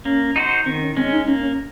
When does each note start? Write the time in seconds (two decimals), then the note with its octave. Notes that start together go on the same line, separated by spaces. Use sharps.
0.05 A#3 C#4
0.36 D#4 F#4 C5
0.66 D#3 C4
0.82 C#4
0.97 G#3 C4 C#4
1.12 D#4
1.27 A#3 C#4
1.42 C#4